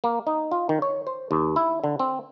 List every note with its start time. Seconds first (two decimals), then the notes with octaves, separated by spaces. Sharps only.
0.04 A#3
0.27 D#4
0.52 F4
0.69 D#3
0.82 C#5
1.07 C5
1.31 D#2
1.56 E4
1.84 D3
1.99 C4